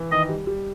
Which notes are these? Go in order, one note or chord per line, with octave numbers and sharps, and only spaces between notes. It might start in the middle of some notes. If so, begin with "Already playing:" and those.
Already playing: E3
D#3 D#5
G3
G3